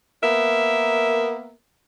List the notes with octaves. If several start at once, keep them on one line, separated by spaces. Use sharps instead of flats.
A#3 B3 A#4 E5